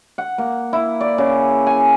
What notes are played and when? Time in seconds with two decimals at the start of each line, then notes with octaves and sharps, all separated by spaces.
0.18 F#5
0.38 A#3
0.73 E4
1.01 D5
1.18 C#3
1.67 G#5